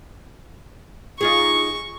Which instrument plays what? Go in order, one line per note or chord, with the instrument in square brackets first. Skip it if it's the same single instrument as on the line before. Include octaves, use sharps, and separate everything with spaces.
[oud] D#4 F4 G#4 [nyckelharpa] C#6